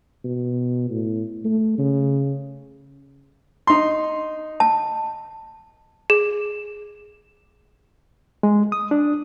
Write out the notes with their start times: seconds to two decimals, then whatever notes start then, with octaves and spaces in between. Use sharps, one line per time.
0.24 B2
0.90 A2
1.44 A3
1.78 C#3
3.67 D#4 C6
4.60 A5
6.10 G#4
8.43 G#3
8.72 D#6
8.91 D4